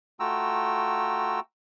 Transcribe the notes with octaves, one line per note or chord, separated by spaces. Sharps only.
A3 F4 F#4 G5 A#5 E6